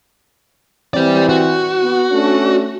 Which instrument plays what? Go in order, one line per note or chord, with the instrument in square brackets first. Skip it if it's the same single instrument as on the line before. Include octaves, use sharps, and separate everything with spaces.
[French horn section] E3 C4 [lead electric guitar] G4 D5
[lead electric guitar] F#4
[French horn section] B3
A3 C#4 D4